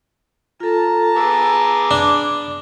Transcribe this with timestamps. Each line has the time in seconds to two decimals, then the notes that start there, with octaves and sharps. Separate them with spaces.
0.60 F4 A4 A5 A#5
1.16 B3 G#4 D6 E6
1.91 D4